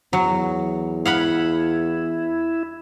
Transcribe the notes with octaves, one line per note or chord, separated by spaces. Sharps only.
E2 F#3
E4 F5 F#5 B5